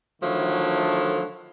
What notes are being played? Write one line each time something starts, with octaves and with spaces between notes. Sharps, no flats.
D3 D#3 F3 F#3 A3 E4